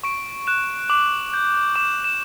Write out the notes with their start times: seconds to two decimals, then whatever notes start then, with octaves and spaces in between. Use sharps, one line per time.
0.04 C#6 D7
0.47 F#6 E7
0.90 D6 F#7
1.33 G6
1.75 D6 E7
2.04 E7